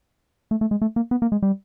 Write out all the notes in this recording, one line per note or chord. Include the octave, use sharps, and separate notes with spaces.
A3
A3
G#3
A3
A#3
B3
A#3
G#3
G3